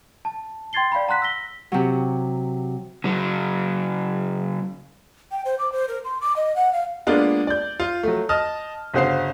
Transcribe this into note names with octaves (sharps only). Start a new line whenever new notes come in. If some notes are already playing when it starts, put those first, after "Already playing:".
A5
G5 C6 G#6 A6 C7 G7
D5 F5 G5 B5
F#5 A#5 C6 F#6 B6
E6 A#6 B6 G7
C3 F#3
C#3 F#3
G5
C5
D6
C5
A#4
C6
D6
D#5
F#5
F5
G#3 A#3 B3 D4 F4
D5 G6
F4
F#3 A3
D#5 A5 F6
G1 C#3 F#4 C5 F5 C7